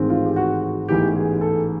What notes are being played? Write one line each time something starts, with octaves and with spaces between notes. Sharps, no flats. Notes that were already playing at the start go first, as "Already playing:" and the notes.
Already playing: A1 G#2 D#3 G#3 C4
F4
G4
F#4
F#4
A1 G#2 E3 G#3 B3 G4
G#4
A4